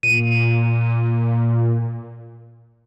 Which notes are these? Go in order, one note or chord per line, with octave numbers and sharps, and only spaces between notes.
A#2 D#7